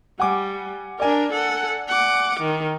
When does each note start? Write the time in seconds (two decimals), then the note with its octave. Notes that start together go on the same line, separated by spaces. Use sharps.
0.20 G3 F#5 G#5 D6
1.00 D4 A#4 D5 G#5
1.33 A4 F#5
1.88 F#5 D6
2.40 D#3